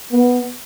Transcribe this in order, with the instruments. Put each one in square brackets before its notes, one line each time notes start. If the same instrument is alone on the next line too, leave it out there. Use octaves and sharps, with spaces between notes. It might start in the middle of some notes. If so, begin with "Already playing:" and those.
[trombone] B3